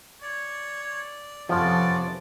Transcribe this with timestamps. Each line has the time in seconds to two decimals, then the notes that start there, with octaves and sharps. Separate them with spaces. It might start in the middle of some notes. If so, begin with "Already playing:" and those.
0.22 C#5 D5
1.49 F2 C3 F3 B3 C#4 F4 A4 D5